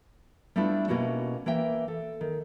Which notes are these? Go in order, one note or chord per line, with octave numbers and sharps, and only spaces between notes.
G3 A3 B3 D4 E4 F4
B2 A#3 C#4 E4 F#4 G4
E3 A#3 E5 G5
A4
D#3